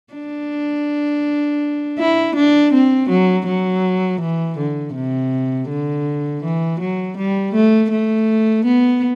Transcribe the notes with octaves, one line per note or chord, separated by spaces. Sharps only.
D4
E4
D4
C4
F#3
F#3
E3
D3
C3
D3
E3
F#3
G3
A3
A3
B3